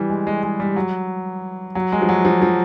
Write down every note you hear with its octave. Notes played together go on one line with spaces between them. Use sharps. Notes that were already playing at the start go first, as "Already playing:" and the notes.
Already playing: E3 G3
G#3
G#3
G#3
G3
F#3
F#3
G#3
F3
F#3
F3
F3